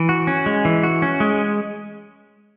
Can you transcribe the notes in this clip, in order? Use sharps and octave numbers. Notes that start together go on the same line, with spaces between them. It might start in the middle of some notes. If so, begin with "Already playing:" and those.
Already playing: E3
F#4
C#4
G#3
E3
F#4
C#4
G#3